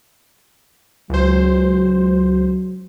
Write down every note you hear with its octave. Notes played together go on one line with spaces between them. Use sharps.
C#2 F#3 C5